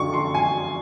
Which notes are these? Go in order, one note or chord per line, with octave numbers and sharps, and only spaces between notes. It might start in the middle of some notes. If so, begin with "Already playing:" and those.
Already playing: F#2 D3 C#6
C6
G#5